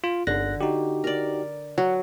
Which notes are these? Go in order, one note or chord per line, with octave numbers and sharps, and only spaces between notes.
F4
G1 D3 F#6 A#6
D#4 F#4 G4
A#4 D5
F#3 F#5